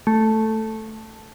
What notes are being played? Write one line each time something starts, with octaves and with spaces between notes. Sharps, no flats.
A3